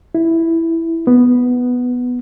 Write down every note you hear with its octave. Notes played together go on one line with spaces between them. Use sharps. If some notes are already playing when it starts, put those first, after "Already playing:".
E4
B3